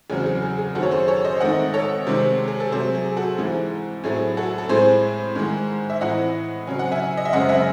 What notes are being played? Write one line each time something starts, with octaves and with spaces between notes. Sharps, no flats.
E2 C#3 F#3 C4 G#4
G#4
G#4
G#4
F#2 D#3 A3 C4 F#4 A4
C#5
G#4 C5
A4 C#5
C5 D#5
G#2 D#3 A3 C4 D#5 F#5
A4 C#5
C3 D#3 G#3 C4
G#4
A4
C3 F#3 A3 G#4 C5
G#4
F#4 A4
G#2 E3 A3 C4 G#4
A2 F#3 A3 C4 G#4
F#4 A4
A4
A2 G#3 C4 G#4 C5
G#2 D#3 G#3
E5
A2 E3 C4 D#5 F#5
C#3 F#3 C4 G#5
F#5
E5 G#5
D#5
E5
F#2 C#3 G#3 C4 D#5 F#5
E5 G#5